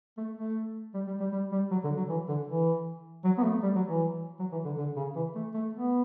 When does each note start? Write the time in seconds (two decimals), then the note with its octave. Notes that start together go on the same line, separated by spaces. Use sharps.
0.17 A3
0.37 A3
0.94 G3
1.07 G3
1.20 G3
1.32 G3
1.52 G3
1.71 F#3
1.84 D3
1.97 F#3
2.09 E3
2.29 D3
2.48 E3
3.24 F#3
3.38 B3
3.43 A3
3.62 G3
3.75 F#3
3.88 E3
4.39 F#3
4.52 E3
4.65 D3
4.78 D3
4.96 C#3
5.16 E3
5.35 A3
5.54 A3
5.73 B3